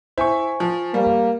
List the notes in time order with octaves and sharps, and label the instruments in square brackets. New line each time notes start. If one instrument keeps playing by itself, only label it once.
[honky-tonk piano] E4 [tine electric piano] C5 G#5 C#6
[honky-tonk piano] F3
[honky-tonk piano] G3 [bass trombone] A#3